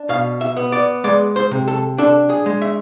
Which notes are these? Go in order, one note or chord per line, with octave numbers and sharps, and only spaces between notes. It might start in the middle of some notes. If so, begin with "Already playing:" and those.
Already playing: D4
B2 F5
E5
B3
D5
G#3 D5
C5
C3
A4
D4 A4
G#4
G#3
E5